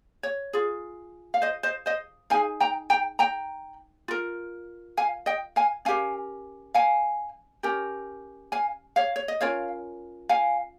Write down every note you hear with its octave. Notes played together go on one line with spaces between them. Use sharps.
C#5
F4 G#4
F5
C5 D#5
C5 D#5
C5 D#5
D#4 G#4 F5 G#5
G5 A#5
G5 A#5
G5 A#5
F4 A#4
F5 G#5
D#5 G5
F5 G#5
C#4 G4 A#4 F5 G#5
F5 G#5
C#4 G4 A#4
F5 G#5
C#5 F5
C#5
D#5
C#4 F4 A#4 C#5 F5
F5 G#5